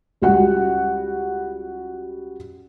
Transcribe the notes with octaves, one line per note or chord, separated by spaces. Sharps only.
C#2 G3 F#4 F#5